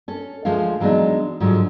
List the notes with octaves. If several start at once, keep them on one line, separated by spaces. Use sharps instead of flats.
C#4 A4
D2 F3 G#3 A3 F5
E3 F#3 G#3 B3 D4 D#4
G#2 D3 F3 F#3